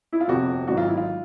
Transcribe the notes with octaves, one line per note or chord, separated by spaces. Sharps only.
E4
F4
G1 F2 C3 F#4
A1 G#2 D#3 F#3 F#4
F4
E4
F4